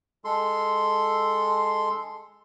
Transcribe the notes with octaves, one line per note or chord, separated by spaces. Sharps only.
G#3 A4 C6